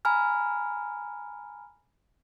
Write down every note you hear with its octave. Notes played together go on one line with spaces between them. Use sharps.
G#5 A#5 B5 F6